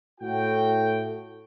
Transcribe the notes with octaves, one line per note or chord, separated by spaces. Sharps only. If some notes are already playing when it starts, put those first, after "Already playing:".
A2 F#4 G5